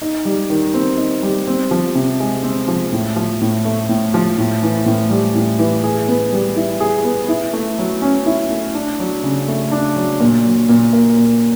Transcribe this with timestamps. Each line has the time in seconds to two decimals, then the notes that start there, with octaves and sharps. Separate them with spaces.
0.02 D#4
0.25 G3
0.50 D#3
0.74 C4
0.98 D#4
1.23 G3
1.47 C4
1.71 F3
1.95 C3
2.20 G#3
2.43 C4
2.68 F3
2.92 A2
3.16 F3
3.41 A2
3.65 A3
3.89 A2
4.14 F3
4.38 A2
4.63 E3
4.86 A2
5.10 G3
5.35 A2
5.59 E3
5.84 G#4
6.08 B3
6.32 G3
6.57 E4
6.80 G#4
7.04 B3
7.29 E4
7.53 A3
7.78 F#3
8.02 C#4
8.26 E4
8.50 A3
8.75 D4
9.00 F#3
9.23 C#3
9.48 A3
9.72 D4
9.96 F#3
10.20 A#2
10.45 F#3
10.69 A#2
10.93 A#3
11.17 A#2